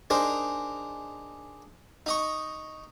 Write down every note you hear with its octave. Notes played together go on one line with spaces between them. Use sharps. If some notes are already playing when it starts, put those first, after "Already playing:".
D4 D#4 G#4 A#4 C5
D#4 D#5 C#6